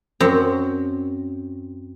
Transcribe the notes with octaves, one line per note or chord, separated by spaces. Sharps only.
F#2 C4